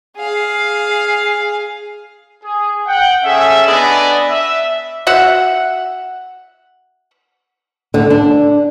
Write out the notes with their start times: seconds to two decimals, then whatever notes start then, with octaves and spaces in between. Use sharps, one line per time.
0.16 G#4 F5
2.44 G#4
2.87 F#5 G5
3.24 C#4 G#4 A4 E5
3.67 B3 D4 B4 D5 D#5 G#5
4.30 E5
5.07 F#4 E5 F#5
7.94 D3
8.10 D4